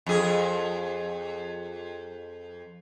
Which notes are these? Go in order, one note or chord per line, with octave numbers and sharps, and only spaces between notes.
F2 G#4